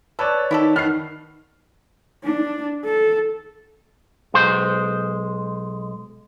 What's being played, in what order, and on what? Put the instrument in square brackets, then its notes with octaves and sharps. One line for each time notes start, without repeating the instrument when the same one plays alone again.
[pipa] A4 [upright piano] B4 C#5 D5
[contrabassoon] D#3 [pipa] E4 G4 A4
[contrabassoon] D#3 [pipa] A3 B3 [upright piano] F6 C7
[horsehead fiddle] D4
A4
[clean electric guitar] B1 G#3 C5